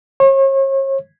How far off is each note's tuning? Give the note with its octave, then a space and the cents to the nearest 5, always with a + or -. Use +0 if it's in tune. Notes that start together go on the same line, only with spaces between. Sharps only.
C#5 -40